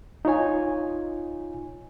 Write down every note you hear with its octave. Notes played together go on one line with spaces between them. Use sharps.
D#4 F4 C#5 G#5